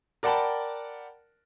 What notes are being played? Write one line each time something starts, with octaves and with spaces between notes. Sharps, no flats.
A#4 D5 F#5 G5 A5 B5